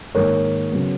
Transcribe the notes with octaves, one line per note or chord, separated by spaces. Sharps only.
G#2 D#3 A#3 A#4 C#5
C#3 F#3 B3